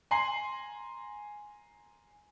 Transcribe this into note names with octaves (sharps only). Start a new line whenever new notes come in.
G#5 A#5 C6 C7 F#7